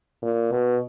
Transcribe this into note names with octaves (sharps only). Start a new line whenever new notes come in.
A#2
B2